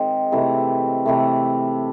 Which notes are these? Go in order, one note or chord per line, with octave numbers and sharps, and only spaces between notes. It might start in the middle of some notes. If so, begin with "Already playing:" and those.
Already playing: D#3 G#3 C4
C3 E3 A3
C3 E3 A3